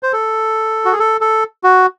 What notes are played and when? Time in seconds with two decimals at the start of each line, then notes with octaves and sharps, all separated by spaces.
0.03 C5
0.13 A4
0.85 F#4
0.92 G#4
0.99 A4
1.21 A4
1.64 F#4